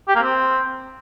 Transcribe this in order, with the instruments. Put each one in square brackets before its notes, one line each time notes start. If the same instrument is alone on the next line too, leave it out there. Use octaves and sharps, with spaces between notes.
[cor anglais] G4
A#3
C4